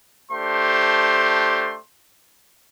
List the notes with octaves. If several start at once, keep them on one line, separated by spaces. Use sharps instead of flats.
A3 D4 G4 C5 C6